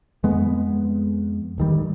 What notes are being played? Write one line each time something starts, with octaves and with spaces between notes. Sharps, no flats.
F2 G#3 B3
D1 D#3 G3